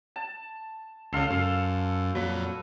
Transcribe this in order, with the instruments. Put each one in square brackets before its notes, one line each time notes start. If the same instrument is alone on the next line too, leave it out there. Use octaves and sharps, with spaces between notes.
[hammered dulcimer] A5
[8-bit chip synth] C#2 C#3 [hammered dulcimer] A4 F5 C6
[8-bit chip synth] F#2
[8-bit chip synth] F2 A#2 F#3 [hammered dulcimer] B4